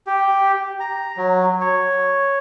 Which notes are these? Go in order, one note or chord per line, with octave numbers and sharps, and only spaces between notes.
G4
A#5
F#3
C#5